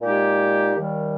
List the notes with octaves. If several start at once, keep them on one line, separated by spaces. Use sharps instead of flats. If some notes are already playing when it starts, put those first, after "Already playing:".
A#2 G#3 D#4 G4
D#2 D#3 G3